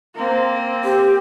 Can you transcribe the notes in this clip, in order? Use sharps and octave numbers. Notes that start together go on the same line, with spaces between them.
A#3 C4
G4